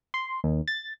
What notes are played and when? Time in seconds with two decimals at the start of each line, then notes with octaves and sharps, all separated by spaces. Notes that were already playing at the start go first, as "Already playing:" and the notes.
0.14 C6
0.44 D#2
0.68 A6